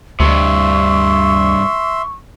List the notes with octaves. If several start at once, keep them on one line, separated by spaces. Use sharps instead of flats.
D2 G2 C3 E5 C6 C#6